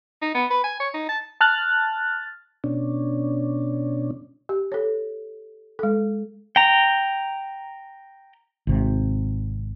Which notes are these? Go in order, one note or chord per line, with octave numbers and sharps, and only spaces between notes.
D#4
B3
B4
G#5
C#5
D#4
A5
A5 F6 F#6 A6
B2 C#4 D4
G4
A4 C#5
G#3 A4
G5 A#5
G#1 C3